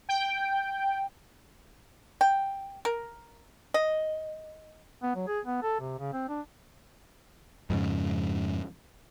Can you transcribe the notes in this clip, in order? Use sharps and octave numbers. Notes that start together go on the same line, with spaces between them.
G5
G5
A#4
D#5
B3
F#3
G#4
B3
A4
C3
C#3
C4
D4
F2 G#2 C#3